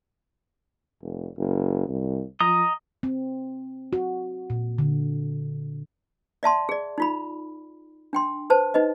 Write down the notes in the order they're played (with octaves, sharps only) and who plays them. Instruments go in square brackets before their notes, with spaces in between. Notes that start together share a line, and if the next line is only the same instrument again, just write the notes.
[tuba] F1
F#1
C2
[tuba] F3 [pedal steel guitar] D#5 A#5 D#6
[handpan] C4
F#4
A#2
D3
[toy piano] D5 E5 A5 C6
G#4 D5
D#4 F4 B5
D4 G5 C6
B4 C5 A5
D#4 B4 D#5